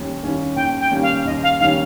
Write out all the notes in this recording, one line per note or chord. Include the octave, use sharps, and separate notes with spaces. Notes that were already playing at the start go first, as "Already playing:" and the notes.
Already playing: D#2 D#3 G3 A#3 C#4
D#3 G3 A#3 C#4
D#2 G5
G5
D#3 G3 A#3 C#4
F5
D#2 D#5
F5
D#3 G3 A#3 C#4 F5